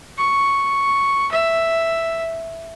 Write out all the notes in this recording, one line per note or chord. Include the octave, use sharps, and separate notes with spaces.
C#6
E5